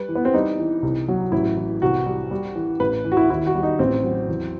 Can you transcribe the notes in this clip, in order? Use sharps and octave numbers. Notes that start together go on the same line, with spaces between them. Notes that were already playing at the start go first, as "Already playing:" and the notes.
Already playing: G3 B4
E3
B3
C4
G3 D#4
E3
C2
F#3
A1 E4
E3
C2 F#4
G3
G3
E3
A1 B4
E3
F#4
E4
D#2 E4
F#4
G3
D#4
A1 C4
F#3
E2